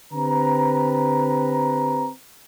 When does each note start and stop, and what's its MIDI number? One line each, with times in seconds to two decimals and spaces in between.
0.12 2.09 50
0.12 2.09 60
0.12 2.09 67
0.12 2.09 71
0.12 2.09 82